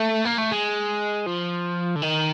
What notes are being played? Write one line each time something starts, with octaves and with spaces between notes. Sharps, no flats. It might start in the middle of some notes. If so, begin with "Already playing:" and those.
Already playing: A3
A#3
A3
G#3
F3
D3
D#3